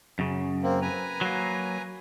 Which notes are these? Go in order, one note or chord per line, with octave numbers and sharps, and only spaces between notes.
F#2 C#3
A#3 C4
B4 G#5 A#5
F#3 A#3